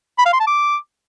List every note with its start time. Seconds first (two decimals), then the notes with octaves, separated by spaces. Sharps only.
0.19 B5
0.26 F5
0.33 C6
0.40 A5
0.47 D6